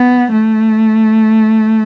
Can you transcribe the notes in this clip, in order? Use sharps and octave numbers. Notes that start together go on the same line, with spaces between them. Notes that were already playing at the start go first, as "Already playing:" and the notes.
Already playing: B3
A3